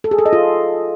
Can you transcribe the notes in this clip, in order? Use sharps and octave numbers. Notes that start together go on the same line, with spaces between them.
A4
G#4
A4
D#5
F4